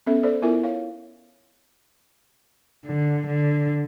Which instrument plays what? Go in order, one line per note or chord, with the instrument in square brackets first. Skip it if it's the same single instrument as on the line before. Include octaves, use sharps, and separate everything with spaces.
[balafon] B3 C#4 A4 E5
A4 C5 D5
B3 E4 F4 A#4 E5 G#5
C#5 F5
[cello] D3
D3